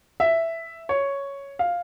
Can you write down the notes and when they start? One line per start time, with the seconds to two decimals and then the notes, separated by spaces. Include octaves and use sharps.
0.20 E5
0.89 C#5
1.59 F5